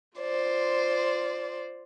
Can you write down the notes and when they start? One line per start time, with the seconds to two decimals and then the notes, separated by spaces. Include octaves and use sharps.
0.18 F4 C5 D5